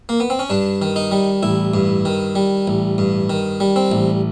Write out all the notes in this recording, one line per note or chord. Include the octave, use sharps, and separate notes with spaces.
A#3
B3
C4
C#4
G2 D4
D#3
D#4
G3
A1 E4
G2
D#3
G3
A1
G2
D#3
G3
C4
A1